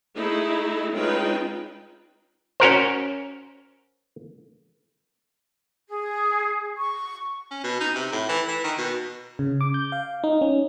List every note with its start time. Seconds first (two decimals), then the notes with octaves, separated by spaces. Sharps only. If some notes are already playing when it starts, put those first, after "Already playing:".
0.14 A3 D#4 E4 G#4
0.95 G#3 C#4 D#4 F4 B4 G5
2.60 C#4 F#4 A#4 C5
5.89 G#4
6.78 C#6
7.51 C#4
7.63 B2
7.80 D#4
7.95 C3
8.12 A2
8.29 E3
8.48 E3
8.64 D#3
8.78 B2
9.39 C#3
9.61 D6
9.74 G6
9.92 F5
10.24 D#4
10.41 C#4